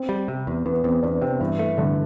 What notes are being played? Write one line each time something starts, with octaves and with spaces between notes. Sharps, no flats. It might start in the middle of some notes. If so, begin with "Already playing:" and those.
Already playing: C4
G3
C3
E2
E2 B3
E2 C4
E2 D4
C3 C4
G2 E3
A3
G2 D3